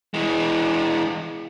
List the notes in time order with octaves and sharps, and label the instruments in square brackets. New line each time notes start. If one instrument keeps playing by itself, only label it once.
[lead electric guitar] E3 G#3